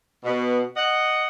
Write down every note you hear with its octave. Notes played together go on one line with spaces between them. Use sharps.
B2
D#5 F#5